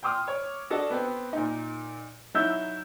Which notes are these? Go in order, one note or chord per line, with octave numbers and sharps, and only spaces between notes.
G5 C6 D6 D#6 F6
C#5
D4 F#4 A4 D#5 A5
B3 C4
A#2 D#4
F#3 D#4 E4 E5 E6 G6